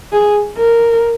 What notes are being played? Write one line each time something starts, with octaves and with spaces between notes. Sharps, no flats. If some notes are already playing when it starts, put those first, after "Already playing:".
G#4
A#4